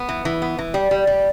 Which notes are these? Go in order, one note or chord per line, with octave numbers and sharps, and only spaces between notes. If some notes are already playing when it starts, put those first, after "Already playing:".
Already playing: B3
E3
E3
B3
E3
G3
G3
G3